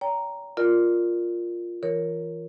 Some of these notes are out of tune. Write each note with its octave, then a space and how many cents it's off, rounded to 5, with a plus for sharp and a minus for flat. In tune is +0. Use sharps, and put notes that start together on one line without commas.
C#5 +45 G5 +0 A#5 +0
F4 +0 A#4 +0 D5 +15
E3 +0 A#4 +0 C#5 +5